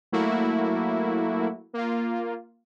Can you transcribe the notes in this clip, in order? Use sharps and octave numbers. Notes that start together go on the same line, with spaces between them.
F#3 A3 A#3 E4 F#4
A#3 F4